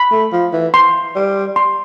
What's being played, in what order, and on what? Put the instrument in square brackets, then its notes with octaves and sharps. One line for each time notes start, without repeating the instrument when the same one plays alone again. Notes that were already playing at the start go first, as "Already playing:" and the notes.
Already playing: [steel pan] B5
[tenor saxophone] A3
F3
E3
[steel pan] C6
[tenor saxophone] G3
[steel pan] C6